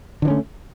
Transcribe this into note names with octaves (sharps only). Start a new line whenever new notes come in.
D3 E3 A3 C#4